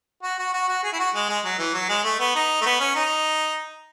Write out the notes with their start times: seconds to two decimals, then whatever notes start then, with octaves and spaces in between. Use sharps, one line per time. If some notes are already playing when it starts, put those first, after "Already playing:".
0.23 F#4
0.38 F#4
0.53 F#4
0.68 F#4
0.83 G#4
0.93 E4
0.99 F#4
1.14 G#3
1.29 G#3
1.44 F#3
1.58 E3
1.74 F#3
1.89 G#3
2.04 A3
2.19 B3
2.35 D#4
2.61 A3
2.66 B3
2.80 C#4
2.95 D#4